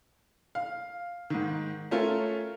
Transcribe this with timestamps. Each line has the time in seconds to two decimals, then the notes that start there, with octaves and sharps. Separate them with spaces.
0.55 F5
1.30 G#2 D#3
1.91 A3 C#4 F4 A#4